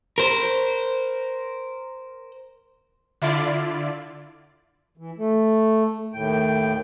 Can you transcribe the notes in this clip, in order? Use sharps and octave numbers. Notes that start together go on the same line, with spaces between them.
A#4 C5
D3 E4 F4 D5
E3
A3
D#2 A2 G5